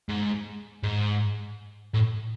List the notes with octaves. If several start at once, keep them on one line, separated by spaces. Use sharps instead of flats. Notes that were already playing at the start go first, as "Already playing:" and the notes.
G#2
G#2
A2